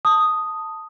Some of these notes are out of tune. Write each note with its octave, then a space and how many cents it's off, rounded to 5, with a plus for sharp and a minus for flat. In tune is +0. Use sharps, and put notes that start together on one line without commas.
A5 +15 D#6 +0